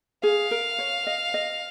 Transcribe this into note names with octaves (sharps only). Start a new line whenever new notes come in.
G#4 F5
A#4
C#5
D#5
D#5